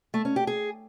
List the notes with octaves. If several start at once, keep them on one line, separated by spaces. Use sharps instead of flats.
A3
C#4
G4
G#4